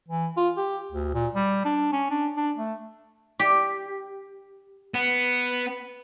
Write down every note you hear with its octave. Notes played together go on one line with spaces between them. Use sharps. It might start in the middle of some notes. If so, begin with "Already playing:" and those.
E3
F4
G4
D2
A#2
G3
D4
C#4
D4
D4
A3
G4
B3